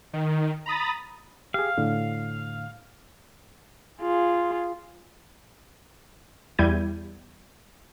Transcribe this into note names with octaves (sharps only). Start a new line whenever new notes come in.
D#3
A#5 B5 D#6 A6
G4 G#4 F5
A2 D3
F4 G#4
E2 G3 E4 G6 G#6 D#7